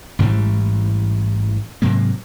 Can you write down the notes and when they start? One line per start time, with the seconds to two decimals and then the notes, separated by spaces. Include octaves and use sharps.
0.19 A1 G#2 E3 G3
1.82 G#2 C3 F#3 A#3